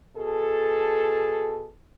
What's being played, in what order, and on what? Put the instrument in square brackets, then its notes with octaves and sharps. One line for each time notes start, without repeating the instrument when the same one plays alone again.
[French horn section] B2 G#4 A4